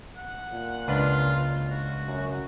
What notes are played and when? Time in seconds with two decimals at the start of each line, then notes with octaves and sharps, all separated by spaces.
0.17 F#5
0.52 A#2
0.88 C#2 D4 F4 B4
1.70 F#4
2.06 F#2